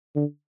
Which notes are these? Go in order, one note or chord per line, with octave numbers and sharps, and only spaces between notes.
D3